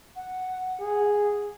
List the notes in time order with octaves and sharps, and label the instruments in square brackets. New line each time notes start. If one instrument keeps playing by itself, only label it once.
[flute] F#5
[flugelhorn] G#4